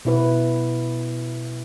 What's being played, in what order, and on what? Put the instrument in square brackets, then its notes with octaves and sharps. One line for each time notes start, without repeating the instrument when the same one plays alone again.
[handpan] B2 E4 B4